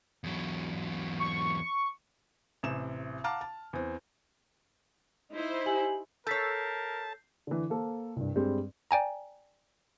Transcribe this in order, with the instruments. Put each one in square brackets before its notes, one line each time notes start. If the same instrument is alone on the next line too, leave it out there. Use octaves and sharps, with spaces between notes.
[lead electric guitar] E2 F#3
[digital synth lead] C#6
[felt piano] A1 C3 E7
F5 F#5 A5 A#5 D6 F6
A5
E2 C4
[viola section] D#4 E4 C5
[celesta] G4 G#5 F#7
[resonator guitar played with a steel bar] A4 C#5 [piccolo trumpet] A#4 [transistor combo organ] A5 [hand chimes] G6 B6 C7
[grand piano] D3 E3
A#3 A4 C5
C2 G2
G2 G3 G#3 C4
[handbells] D5 G5 G#5 A#5